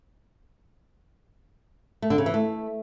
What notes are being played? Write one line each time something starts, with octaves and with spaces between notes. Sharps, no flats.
A3
D3
C#3
E3
A3